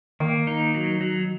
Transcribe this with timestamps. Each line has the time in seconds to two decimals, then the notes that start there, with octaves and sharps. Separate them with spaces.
0.20 D#3 A#3
0.47 D#4
0.74 F#3
1.01 F#3